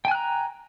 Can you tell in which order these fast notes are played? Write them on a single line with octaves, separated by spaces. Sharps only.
G5 G#5 F#6 A#5